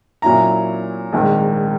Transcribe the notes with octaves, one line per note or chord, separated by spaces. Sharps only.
A#2 F#3 C#4 E4 A#5
A#1 G#2 D#3